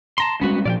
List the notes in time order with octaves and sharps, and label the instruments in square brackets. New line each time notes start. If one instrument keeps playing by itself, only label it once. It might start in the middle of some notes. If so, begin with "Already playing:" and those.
[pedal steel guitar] A5 A#5 C6
[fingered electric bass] G3 G#3 C#4 [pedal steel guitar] B3 F#4 B4
[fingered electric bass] A#2 F3 [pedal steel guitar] D5 F5 G5